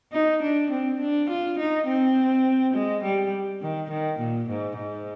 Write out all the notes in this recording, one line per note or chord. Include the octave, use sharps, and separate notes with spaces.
D#4
D4
C4
D4
F4
D#4
C4
G#3
G3
D#3
D#3
A#2
G#2
G#2